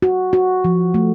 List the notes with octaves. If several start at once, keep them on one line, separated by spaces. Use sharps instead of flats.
F#4
F#4
F3
A3